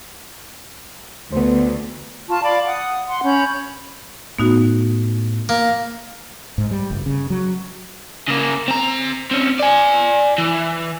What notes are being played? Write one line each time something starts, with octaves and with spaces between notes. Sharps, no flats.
D2 B3 C5
F4 A5 C#6
D5 F5 B5 D6
F#5 D#6
F#5 C6
C#4 B5 G6
A2 A3 B3 D#4 F#4
A#3
G#2
G3
F#1
C#3
F#3
C#3 A#3
C4 A#5
C4 C#4
D5 G#5
E3